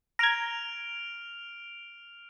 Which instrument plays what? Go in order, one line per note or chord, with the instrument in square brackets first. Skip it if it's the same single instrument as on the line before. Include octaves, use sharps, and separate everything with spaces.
[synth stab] A#5 G#6 [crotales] F6 D7 F7